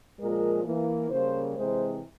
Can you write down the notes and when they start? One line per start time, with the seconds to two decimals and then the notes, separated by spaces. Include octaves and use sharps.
0.20 A#2 F3 G#3 A#4
0.65 E3 A#3
1.10 C#3 G3 A#3 C5
1.55 C3 E3 G#3 C5